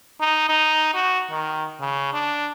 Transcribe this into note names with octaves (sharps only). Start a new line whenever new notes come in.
D#4
D#4
F#4
D#3
C#3
D4